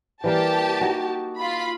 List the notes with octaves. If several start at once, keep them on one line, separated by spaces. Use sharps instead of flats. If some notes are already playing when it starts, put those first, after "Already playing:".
E3 G3 A#3 G4 A5
D#4 F#4
F4 B5